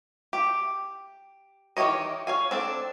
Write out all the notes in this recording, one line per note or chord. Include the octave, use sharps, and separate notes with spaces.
G4
D#3 E3 G4 C#5 D#5
C#5 F5 G#5
C4 D4 A4